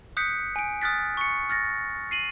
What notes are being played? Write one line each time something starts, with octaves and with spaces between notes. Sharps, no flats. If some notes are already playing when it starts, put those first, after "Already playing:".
D#6 F#6 G6 B6 C#7
G#5 D7
D#6 F6 F#6 A6 B6
C#6 C#7
F6 A6 A#6
C7 D#7 F#7